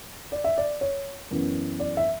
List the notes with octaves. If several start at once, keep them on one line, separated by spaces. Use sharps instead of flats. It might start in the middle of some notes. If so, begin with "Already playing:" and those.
D5
E5
D5
C#5
F#2 E3 B3
D5
E5